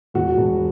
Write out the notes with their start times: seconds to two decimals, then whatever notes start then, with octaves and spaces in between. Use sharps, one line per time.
0.14 E1 F#4
0.37 E1